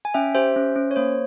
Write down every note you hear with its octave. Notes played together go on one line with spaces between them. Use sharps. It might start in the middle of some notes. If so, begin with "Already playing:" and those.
G#5
C#4 E5 G5
G4 C5 E5
C#4
C#4
C#5
A#3 C5